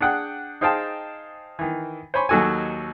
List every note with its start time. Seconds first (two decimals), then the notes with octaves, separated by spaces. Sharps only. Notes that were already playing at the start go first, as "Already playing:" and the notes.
0.01 D4 G#4 F#5 G5 F#6
0.61 D#4 G#4 C5 F5 G5 A5
1.59 D#3 E3
2.14 C5 C#5 G#5 B5 C#6
2.29 D#2 F#3 D#4 F#4 A4 G#5